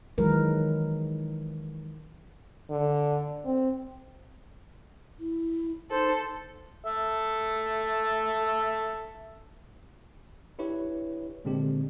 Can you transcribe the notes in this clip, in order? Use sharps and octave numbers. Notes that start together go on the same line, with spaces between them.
D#3 E3 F#3 G#3 A#4 B4
D3
C4
E4
D#4 A4 C5
A4 E5
D4 E4 G4 B4 C#5
A#2 D3 G#3 C4 D4 G4